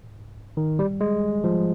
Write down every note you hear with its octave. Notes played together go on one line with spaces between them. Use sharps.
D#3
G3
G#3
F3